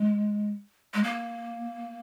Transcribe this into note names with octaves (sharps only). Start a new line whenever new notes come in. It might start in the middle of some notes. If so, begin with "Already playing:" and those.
Already playing: G#3
G#3
A#3